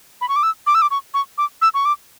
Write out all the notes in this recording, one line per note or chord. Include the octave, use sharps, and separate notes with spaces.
B5
C#6
D6
E6
D6
E6
D6
C#6
C#6
D6
E6
C#6
D6